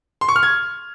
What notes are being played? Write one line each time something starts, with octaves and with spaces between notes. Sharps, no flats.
C6
C#6
F6
G#6